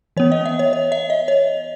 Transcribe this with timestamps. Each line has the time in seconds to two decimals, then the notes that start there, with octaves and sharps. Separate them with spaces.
0.17 E3 B3 C#5
0.32 D#5
0.45 E5
0.59 C#5
0.73 C#5
0.92 E5
1.10 D#5
1.28 C#5